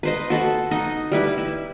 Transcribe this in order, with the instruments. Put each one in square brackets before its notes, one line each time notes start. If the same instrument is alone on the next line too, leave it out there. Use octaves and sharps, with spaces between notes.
[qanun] B4 C5 D#5
F#4 A4 B5
D#4 D#5 F#5
G3 E4 B4
E4